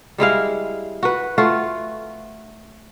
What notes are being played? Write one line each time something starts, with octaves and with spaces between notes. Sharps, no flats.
G3 G#3 E4 F5
F#4 B4
A3 F4 F#4